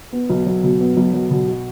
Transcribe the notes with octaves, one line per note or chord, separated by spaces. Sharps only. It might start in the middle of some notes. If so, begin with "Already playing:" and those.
B3
B1
F#3
B2
B3
B1
F#3
B2
F#4